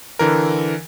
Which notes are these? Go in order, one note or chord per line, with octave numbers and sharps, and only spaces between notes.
D3 E3 A#4